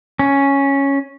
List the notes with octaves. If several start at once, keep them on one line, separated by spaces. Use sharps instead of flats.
C#4